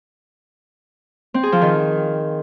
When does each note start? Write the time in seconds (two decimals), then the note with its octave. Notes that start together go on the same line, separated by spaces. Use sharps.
1.34 C4
1.43 G#4
1.52 F3
1.61 D#3